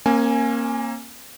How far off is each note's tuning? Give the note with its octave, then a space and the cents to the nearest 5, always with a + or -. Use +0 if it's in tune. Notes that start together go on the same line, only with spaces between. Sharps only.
A#3 +0 C#4 -45 G#5 +0